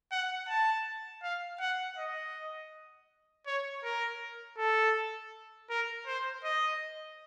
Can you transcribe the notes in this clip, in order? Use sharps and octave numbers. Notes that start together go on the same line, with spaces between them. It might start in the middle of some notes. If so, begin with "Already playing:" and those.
F#5
A5
F5
F#5
D#5
C#5
A#4
A4
A#4
C5
D#5